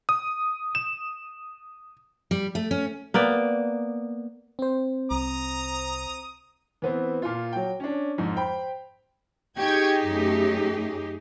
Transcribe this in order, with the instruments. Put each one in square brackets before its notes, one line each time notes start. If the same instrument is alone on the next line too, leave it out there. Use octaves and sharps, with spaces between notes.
[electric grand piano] D#6
E7
[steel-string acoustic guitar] G3
A3
C#4
[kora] A#3 B3 D5 G5
[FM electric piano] C4 C5
[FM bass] C2 [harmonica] A#5 D#6
[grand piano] E3 B3 C4
A#2 F4
F#3 G5
C#4 D4
F2 G#2
C5 G5 B5
[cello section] D#4 G4 G#4 [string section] G5 C#6 G#6
[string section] F#2 A3